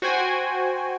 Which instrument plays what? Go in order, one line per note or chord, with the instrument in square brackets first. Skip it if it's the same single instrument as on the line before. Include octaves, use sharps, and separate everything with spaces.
[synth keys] F#4 C5 G5 G#5